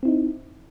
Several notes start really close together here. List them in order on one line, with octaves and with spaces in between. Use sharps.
C4 E4 D#4